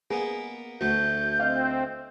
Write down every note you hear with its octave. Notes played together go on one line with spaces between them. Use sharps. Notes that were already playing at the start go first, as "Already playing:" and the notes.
A#3 B3 G#4
D2 A3 F#4 G6
C4 D#5 F5